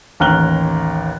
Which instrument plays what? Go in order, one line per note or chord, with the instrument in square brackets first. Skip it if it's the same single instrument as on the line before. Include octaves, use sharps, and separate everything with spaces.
[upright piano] A1 D#2 A#5 F6 F#6 G7